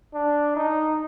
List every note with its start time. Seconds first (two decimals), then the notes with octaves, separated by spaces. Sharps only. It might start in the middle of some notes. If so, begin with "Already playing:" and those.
0.13 D4
0.56 D#4